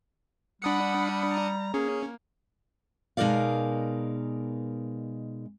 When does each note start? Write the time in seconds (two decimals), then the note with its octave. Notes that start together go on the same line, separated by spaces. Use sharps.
0.62 G3 D4 F#5 B5 D#6 C#7
1.32 A#5
1.74 A#3 C#4 G#4
3.17 B2 G#3 D#4 A#4 D5 F5